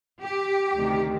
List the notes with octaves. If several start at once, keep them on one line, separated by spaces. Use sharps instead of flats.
G4
D2 C3 D#3